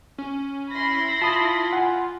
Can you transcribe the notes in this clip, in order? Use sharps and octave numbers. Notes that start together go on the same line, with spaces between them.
C#4
E4 B5 C6 A#6
F4 A5 D#6
F#5 G#5